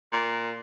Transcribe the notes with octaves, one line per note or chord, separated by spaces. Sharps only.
A#2